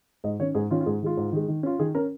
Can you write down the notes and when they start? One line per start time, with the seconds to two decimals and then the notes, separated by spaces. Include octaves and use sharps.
0.24 G#2 D#5
0.39 D#3 C#4 C#5
0.55 G#2 G#4
0.71 D#3 C#4 F4
0.81 F4
0.86 G#2 G#4
1.02 D#3 G#3 F4
1.17 G#2
1.32 D#3 G#3
1.48 D#3
1.63 C#4 F4
1.79 D#3 G#4
1.95 C#4 A#4